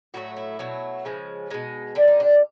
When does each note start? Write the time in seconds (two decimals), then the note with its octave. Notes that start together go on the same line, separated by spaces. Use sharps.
0.14 A2 F#3 A3 F#4
0.37 E4
0.59 B2 F#3 A3
1.05 C#3 F3 G#3
1.50 B2 G#3 D#4
1.95 D3 G3 D4
2.07 D#4
2.20 D4